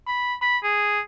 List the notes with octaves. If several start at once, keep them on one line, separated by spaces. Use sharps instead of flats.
B5
B5
G#4